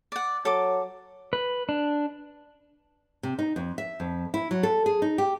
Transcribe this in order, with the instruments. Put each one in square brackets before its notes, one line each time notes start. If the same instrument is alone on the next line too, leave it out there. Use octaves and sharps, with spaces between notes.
[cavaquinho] D5 F#5
[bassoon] F#3 [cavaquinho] A4 D6
[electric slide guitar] B4
D4
[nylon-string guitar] C3
D#4
F2
E5
F2
E4
F#3
A4
G#4
D#4
G4